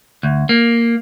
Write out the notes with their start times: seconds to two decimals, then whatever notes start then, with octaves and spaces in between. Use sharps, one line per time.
0.23 D2
0.49 A#3